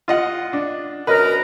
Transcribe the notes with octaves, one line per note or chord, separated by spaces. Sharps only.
F4 D#5 F#5
D4
F#2 B2 A#4 B4 D#5